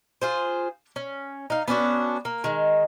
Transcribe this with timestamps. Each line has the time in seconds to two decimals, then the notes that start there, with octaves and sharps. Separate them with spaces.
0.22 F4 G#4 C5
0.96 C#4
1.50 D#4 F5
1.68 B3 C#4 D4 F#4
2.25 A#3
2.44 D#3 G#3